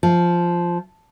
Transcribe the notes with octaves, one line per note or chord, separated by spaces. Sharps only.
F3